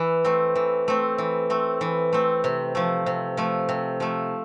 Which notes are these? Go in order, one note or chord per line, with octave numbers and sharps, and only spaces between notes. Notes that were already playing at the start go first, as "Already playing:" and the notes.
Already playing: E3
A3 C4
E3
A3 C4
E3
A3 C4
E3
A3 C4
C3
F3 A3
C3
F3 A3
C3
F3 A3